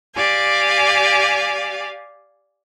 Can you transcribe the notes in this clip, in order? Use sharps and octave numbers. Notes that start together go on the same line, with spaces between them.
G4 D5 F5 G#5